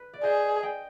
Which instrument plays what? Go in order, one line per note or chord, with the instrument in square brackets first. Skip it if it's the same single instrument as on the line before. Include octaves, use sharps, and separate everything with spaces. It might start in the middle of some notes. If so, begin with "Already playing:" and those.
Already playing: [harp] B4
D5
[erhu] G#4 [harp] C5 D#5
[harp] D#5 G5